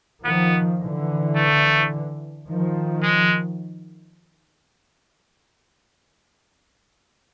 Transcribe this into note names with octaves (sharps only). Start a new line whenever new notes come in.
D#3 F3 B3
D3 E3
A3
D#3 F3
G#3